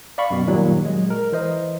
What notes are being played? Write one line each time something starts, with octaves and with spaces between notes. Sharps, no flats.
D5 F5 B5 C#6
F#2 B2
A#2 D#3 F#3 G3
F#3 G#3
A#4
E3 C5 D#5